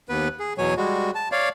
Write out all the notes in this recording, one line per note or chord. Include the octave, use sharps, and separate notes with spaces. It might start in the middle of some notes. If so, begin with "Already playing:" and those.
D#2 B3 B4
G#4
E2 B2 F#3 C#5 G#5
G3 G#3 F#4
A5
C#5 D5 F5